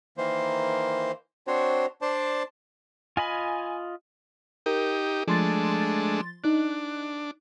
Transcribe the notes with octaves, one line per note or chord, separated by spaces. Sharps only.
D#3 E3 A#3 C5
C4 D4 F#4 C5 C#5
D4 C5 D5 A5
F4 D#5 G#5 B5
D#4 G4 A#4
F3 G#3 A3 D4 C6 A6
D4 D#4 F#6